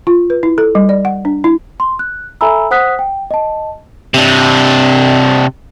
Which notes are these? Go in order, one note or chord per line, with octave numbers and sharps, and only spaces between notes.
F4
B4
E4
A4
G3
D5
F#5
D4
E4
C6
F#6
A4 E5 G#5 A#5 B5 E6
C5 F#5 D#6 F#6 B6
G5
D#5 A5
C3 D4